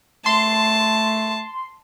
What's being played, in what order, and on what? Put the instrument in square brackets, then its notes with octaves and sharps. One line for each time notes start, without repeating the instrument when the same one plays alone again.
[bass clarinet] A3 [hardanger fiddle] A5 [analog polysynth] C6